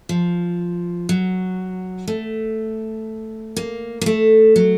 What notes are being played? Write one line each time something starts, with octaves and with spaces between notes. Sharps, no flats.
F3
F#3
A3
A#3
A#3
A3
F#3